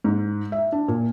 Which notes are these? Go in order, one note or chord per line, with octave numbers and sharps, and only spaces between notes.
G#2
E5
D4
A#2